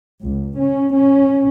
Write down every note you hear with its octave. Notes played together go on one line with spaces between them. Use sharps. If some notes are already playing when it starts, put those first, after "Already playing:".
C#2
C#4
C#4